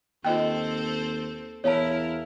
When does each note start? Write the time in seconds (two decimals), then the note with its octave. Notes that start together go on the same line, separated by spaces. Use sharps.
0.25 D#2 C4 F4 A4 C5 D#5 G5
1.64 E2 E4 A#4 C#5 F5 A5